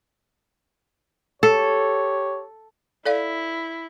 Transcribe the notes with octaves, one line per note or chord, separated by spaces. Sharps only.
G4 A4 C#5
E4 A4 D5 F5